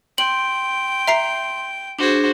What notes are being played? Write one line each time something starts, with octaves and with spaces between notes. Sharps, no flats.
G5 C6 F#7
E5 A#5 C7
D4 F#4 G#4 C5